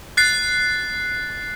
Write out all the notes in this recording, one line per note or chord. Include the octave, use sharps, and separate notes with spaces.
F#6 A6 C7